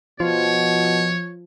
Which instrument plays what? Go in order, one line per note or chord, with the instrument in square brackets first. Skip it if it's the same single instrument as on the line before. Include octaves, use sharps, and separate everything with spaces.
[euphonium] B2 [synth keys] F3 [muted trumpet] C#5